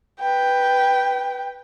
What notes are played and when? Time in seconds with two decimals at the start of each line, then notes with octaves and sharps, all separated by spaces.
0.20 B4 G5